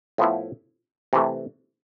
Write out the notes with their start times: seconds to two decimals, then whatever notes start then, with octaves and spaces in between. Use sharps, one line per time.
0.18 A2 F3 B3 E4
1.13 C3 E3 A3